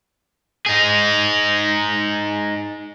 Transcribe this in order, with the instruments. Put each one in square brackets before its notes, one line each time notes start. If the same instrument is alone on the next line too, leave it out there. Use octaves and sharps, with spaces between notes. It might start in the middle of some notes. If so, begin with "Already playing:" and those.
[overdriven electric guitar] D#4 G#4